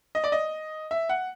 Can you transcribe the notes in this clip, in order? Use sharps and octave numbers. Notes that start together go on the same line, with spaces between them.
D#5
D5
D#5
E5
F#5